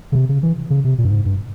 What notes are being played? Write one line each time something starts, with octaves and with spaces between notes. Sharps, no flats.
C#3
C3
C#3
E3
C#3
C3
A#2
G2
G#2
G2